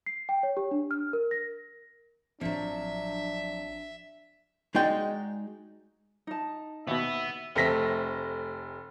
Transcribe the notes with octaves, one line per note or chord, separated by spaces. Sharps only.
C7
G5
C#5
G4
D4
F6
A#4
A#6
A1 F3 F#3 C4 D4 E5
G#3 D#4 F#4 D5 G5
D#4 A5
D#2 B2 B3 E5
F1 A3 C4 A#6 B6